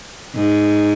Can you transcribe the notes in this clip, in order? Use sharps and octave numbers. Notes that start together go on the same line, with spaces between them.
G#2